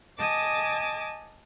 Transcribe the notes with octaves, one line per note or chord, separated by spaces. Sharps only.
D#5 G#5 A5 D6 D#6